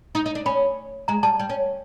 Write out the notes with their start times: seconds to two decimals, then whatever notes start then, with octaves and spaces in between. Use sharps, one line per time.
0.15 D#4
0.26 D#4
0.35 D4
0.46 C#4 B5
1.08 G#3 A#5
1.23 G3 A5
1.40 G3
1.49 C#4